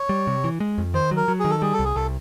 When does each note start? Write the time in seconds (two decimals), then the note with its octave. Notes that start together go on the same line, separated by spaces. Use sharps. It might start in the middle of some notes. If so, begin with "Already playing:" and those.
Already playing: C#5
0.09 G3
0.27 C3
0.44 E3
0.60 G#3
0.78 F2
0.94 D#3 C5
1.11 F#3
1.17 A#4
1.28 F#3
1.40 D#3 G#4
1.51 A4
1.62 G3 G#4
1.73 A4
1.79 C2
1.85 G#4
1.96 C2 A4